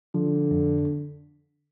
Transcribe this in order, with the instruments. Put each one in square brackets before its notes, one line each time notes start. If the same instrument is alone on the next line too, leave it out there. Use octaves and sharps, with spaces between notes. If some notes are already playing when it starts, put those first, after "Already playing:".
[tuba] D3 [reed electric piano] F3
[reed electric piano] F2